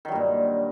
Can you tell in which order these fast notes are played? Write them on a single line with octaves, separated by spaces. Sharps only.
D#3 F#3 G2 A#2